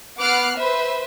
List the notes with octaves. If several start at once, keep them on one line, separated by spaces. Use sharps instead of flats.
B3 F#5 D6 F6 F#6 C7
B4 C5 E5